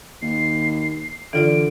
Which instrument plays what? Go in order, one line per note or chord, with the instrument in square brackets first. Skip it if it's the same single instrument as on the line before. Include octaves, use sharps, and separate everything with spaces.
[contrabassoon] D#2 [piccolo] C7
[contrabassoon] D3 [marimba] E3 F4 D5 [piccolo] D7